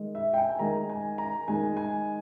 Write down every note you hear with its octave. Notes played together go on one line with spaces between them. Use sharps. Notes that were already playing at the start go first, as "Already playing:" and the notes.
Already playing: D#3 G#3 D#4
E5
G5
G#5
G#5
D#3 G#3 D#4 A#5
G#5
A#5
D#3 G#3 D#4 G#5
G#5